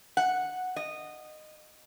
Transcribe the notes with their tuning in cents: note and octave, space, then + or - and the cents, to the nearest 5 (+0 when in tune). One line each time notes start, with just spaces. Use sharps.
F#5 -10
D#5 -15